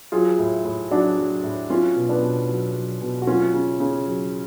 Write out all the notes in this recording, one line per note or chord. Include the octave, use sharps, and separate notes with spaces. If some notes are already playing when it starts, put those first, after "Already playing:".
F#3 F4 G#4
A2
A2
F#3 D4 F#4
F#3
A2
F#3 C#4 F4
B2
B3 D4
B2
F#3
F#3
B2
F#4
F#3 C#4 F4
C#3
C#3
F#3